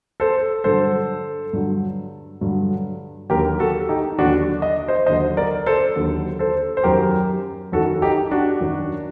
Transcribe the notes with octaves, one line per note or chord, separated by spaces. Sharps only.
A4 C5
G2 D3 F#3 A4 C5
G2 D3 F#3
G2 D3 F#3
D#2 D3 F#3 G4 A#4
F#4 A4
D#4 G4
D#2 D3 F#3 D4 F#4
D#5
C5 D#5
D#2 D3 F#3 C5 D#5
A#4 D5
A4 C5
D#2 D3 F#3
A4 C5
C5
F#2 D#3 F#3 G4 A#4
F#2 D#3 F#3 F#4 A4
D#4 G4
D4 F#4
F#2 D#3 F#3